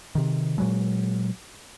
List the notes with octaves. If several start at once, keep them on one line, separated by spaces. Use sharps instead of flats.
C3 D#3
A#2 F#3 G#3